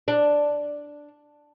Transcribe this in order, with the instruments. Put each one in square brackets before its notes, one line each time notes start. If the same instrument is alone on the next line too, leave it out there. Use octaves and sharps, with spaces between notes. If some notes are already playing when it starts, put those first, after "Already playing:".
[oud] D4